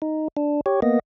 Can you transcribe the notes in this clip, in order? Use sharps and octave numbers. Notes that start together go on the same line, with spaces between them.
D#4
D4
G4 C#5
A#3 B3 D#5